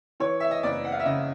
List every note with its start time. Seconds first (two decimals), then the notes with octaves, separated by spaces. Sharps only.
0.20 E3 C#5
0.40 E5
0.51 D#5
0.63 F#1 D5
0.85 F#5
0.92 F5
1.00 E5
1.05 C#3 D#5